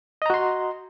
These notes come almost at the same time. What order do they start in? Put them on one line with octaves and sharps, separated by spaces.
D#5 A#5 F#4 C6